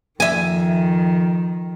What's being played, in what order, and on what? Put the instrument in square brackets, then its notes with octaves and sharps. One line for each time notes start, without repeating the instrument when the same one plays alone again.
[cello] F2 D#3 [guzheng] E5 G#5